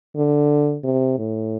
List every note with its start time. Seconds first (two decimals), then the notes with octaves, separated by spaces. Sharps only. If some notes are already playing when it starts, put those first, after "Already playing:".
0.16 D3
0.84 C3
1.18 A2